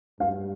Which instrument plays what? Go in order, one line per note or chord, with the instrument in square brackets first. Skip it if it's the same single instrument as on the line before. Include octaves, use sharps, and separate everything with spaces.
[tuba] G2 [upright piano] F5